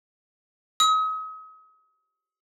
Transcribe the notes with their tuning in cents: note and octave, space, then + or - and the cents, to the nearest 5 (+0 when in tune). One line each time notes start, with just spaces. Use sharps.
D#6 +40